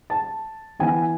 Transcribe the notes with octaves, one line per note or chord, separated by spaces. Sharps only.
A5
E3 B3 E4 G#5